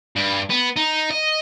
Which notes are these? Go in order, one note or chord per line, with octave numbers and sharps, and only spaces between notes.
G2
B3
D#4
D#5